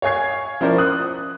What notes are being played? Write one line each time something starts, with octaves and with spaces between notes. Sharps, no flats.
C#5 F5 G#5 G#6 C7
F3 C#4 E4 A#4 C5 D5
D#6 F#6